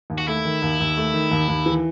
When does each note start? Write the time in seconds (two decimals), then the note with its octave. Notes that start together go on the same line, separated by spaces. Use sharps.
0.10 D#2
0.18 F#4
0.28 A3 E4
0.45 D#3
0.62 D#2
0.80 D#2
0.98 A3
1.14 D#3
1.31 D#2
1.48 D#2
1.66 E3